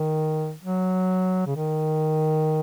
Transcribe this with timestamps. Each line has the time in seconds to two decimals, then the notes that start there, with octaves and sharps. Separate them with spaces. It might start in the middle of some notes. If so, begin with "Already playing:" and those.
Already playing: D#3
0.62 F#3
1.47 C#3
1.56 D#3